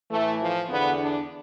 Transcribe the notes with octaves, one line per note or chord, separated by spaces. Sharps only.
A2 E3 A3
F3
E2 D3 B3
D4